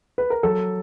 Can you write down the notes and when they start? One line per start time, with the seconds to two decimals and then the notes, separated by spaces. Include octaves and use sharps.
0.18 B4
0.30 A#4
0.43 F#3 A4